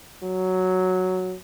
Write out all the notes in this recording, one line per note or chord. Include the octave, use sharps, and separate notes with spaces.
F#3